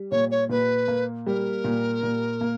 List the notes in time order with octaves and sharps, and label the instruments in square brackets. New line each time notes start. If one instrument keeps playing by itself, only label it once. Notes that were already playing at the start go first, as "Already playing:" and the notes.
Already playing: [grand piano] G3
[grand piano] A#2 [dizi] C#5
[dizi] C#5
[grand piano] A#2 [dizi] B4
[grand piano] A#3
[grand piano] G3 [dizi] A#4
[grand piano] A#2
A#2
A#3